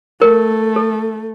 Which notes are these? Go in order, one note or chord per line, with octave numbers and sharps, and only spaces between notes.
A3 A#4
A4